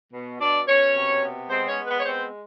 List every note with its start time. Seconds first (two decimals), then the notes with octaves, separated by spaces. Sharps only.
0.13 B2
0.41 B2 D4 D5
0.68 B2 C#4 C#5
0.95 C3
1.24 B3
1.50 G#3 C4 C5
1.68 C#4 C#5
1.78 G#3
1.87 B3 B4
2.00 C#5
2.06 B3 C4 C5